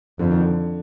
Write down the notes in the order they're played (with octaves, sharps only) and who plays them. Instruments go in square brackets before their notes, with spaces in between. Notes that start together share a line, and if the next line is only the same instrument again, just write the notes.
[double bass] F2 [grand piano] D3
[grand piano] D#3
D3